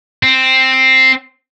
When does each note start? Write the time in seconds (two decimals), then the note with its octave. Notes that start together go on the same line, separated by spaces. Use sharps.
0.23 C4